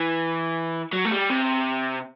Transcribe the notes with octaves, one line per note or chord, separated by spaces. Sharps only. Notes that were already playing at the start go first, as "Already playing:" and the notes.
Already playing: E3
F#3
A3
G3
C3